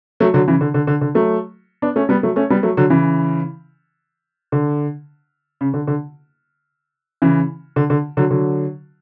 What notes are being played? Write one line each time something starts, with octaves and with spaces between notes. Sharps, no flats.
F#3 A3
D3 F#3
C#3 E3
D3
D3
D3
D3
F#3 A3
B3 D4
A3 C#4
G3 B3
F#3 A3
A3 C#4
G3 B3
F#3 A3
D3 F#3
C#3 E3
D3
C#3
D3
D3
C#3 E3
D3
D3
D3 F#3
D3 F#3